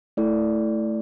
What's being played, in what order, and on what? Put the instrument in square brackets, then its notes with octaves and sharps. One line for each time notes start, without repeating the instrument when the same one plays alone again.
[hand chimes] A3 E4 A4 D5